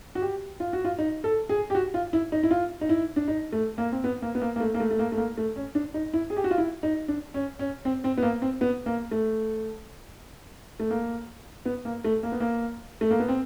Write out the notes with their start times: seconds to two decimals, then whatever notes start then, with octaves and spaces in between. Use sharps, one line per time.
0.15 F#4
0.22 G4
0.60 F4
0.73 F#4
0.84 F4
0.98 D#4
1.24 A4
1.49 G#4
1.70 G4
1.75 F#4
1.94 F4
2.13 E4
2.32 D#4
2.43 E4
2.51 F4
2.81 D#4
2.89 E4
3.16 D4
3.28 D#4
3.52 A3
3.78 A#3
3.92 C4
4.04 B3
4.22 A#3
4.35 B3
4.41 A#3
4.56 A#3
4.60 A3
4.74 A#3
4.80 A3
4.91 A3
4.99 A#3
5.12 A3
5.17 A#3
5.37 A3
5.56 C#4
5.75 D4
5.94 D#4
6.13 E4
6.30 G#4
6.36 G4
6.44 F#4
6.51 F4
6.58 E4
6.83 D#4
7.08 D4
7.34 C#4
7.59 C#4
7.85 C4
8.04 C4
8.18 B3
8.23 A#3
8.42 C4
8.61 B3
8.86 A#3
9.11 A3
10.80 A3
10.90 A#3
11.65 B3
11.85 A#3
12.04 A3
12.23 A#3
12.32 B3
12.40 A#3
13.01 A3
13.11 A#3
13.20 B3
13.28 C4